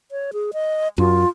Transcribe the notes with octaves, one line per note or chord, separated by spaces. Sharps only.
C#5
G#4
D#5
F#2 F4